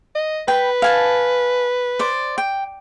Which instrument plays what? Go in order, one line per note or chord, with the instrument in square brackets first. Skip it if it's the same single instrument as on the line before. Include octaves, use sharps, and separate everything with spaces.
[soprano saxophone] D#5
[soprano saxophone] B4 [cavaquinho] G5 B5
[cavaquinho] F5 G#5 A5
C5 D5
G5